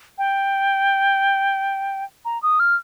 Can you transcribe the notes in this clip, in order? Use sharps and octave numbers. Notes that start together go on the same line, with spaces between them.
G5
A#5
D#6
F6